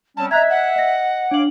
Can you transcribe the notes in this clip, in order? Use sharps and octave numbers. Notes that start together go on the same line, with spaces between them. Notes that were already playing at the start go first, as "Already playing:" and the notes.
G3 C4 C#4 A5
D#5 E5 A#5 F#6 G#6
F#5
D#5 A#6
D4 C#5 F5 D6 F#7